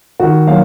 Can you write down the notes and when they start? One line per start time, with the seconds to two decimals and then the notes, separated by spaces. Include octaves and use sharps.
0.20 D#3 F#4
0.47 F#3 A#3 F5